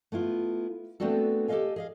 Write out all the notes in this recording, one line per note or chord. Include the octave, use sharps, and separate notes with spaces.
A3 B3 E4 F4
A3 B3 C4 D4 F#4 A4
G4 A4 B4 D#5 F5 G#5
G#4 D#5 F5